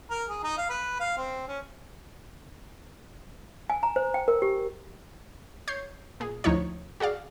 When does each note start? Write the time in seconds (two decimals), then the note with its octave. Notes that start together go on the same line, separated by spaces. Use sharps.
0.10 A#4
0.29 G#4
0.44 D#4
0.58 F5
0.70 B4
1.00 F5
1.17 C4
1.48 C#4
3.70 G#5
3.83 A#5
3.96 C5
4.14 G5
4.28 A#4
4.42 G4
5.68 C#5 G6 C7
6.20 A#2 G#4
6.44 D2 F3 D#4 E4 C#5
7.00 F#4 G#4 D5 F5